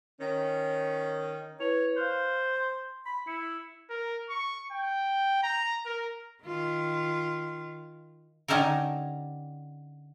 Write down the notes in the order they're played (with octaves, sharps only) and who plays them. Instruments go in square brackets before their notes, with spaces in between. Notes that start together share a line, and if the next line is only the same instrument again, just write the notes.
[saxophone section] D#3 C#4
[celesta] E4 B4 F7 [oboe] C#5
[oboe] C5 [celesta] F5 F6 F#6
[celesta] C6
[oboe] B5
[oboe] E4 [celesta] C#7
[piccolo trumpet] A#4
C#6
G5
A#5
A#4
[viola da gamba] D#3 F4
[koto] D3 C#4 D#4 G4 A4 A#4